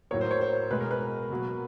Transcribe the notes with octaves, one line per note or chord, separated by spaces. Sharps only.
A2 F#3 A#3 C#5
C5
C#5
C5
B2 G#3 B4
A#4
B4
B2 F#3 A#3